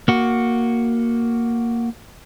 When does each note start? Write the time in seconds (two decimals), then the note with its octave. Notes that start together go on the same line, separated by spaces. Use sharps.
0.08 A#3 F#4